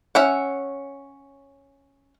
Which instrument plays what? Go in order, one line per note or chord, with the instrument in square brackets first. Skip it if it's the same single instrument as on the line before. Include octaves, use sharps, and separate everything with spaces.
[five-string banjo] C#4 E5 F#5